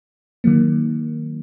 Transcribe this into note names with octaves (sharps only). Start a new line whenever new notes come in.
D#3 F#3 A#3